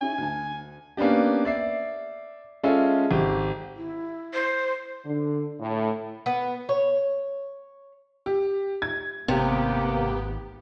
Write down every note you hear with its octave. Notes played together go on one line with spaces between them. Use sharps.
C#4 D#4 E4 G#5
D2 A5
A#3 B3 C#4 D4 G4
D5 E5 C7
G#3 C#4 F4 A4 E5
G#1 G4
E4
C5
D3
A2
B3
C#5
G4
G#6
G#1 C3 A#3 B3 G4